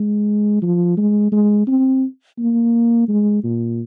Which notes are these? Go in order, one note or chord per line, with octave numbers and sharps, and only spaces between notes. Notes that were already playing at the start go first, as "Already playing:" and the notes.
Already playing: G#3
F3
G#3
G#3
C4
A#3
G#3
A#2